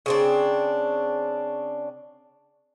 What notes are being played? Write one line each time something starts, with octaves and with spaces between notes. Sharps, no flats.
C#3 C4 D4